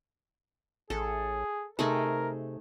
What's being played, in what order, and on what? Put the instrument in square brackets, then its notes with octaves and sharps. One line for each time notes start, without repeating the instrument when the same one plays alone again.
[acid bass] A1 [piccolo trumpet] G#4 [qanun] A4
[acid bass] C3 [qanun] A3 D#4 G#4 [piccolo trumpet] A#4